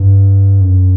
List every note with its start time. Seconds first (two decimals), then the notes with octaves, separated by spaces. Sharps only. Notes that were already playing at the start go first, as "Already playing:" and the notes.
Already playing: G2
0.61 F#2